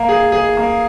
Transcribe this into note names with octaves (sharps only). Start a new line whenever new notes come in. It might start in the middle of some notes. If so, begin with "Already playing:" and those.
Already playing: A#3
G#4
G#4
A#3